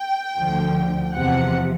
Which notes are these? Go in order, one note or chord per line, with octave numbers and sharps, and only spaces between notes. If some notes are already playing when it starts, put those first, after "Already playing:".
Already playing: G5
D2 D3 F3
E2 C3 F3 F#5